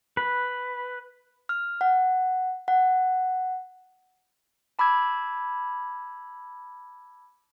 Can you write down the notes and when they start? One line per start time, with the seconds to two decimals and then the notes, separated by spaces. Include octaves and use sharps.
0.17 B4
1.49 F6
1.81 F#5
2.68 F#5
4.79 A5 B5 D6 E6 G#6